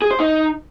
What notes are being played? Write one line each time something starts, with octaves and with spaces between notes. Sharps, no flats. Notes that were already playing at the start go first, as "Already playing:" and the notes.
G#4
C5
D#4